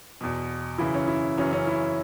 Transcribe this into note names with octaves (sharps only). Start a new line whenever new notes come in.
E2 B2
F#2 C#3 E3 E4
C#4
E4
F#2 C#3 E3 C#4
C#4
E4